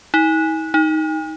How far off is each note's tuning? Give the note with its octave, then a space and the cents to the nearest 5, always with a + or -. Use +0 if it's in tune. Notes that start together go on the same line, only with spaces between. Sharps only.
D#4 +45
D#4 +10